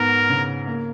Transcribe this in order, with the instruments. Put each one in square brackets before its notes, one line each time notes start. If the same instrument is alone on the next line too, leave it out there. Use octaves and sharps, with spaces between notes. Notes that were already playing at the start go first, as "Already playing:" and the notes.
Already playing: [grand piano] G#2 B3 [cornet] A#4
[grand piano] C#3
A#3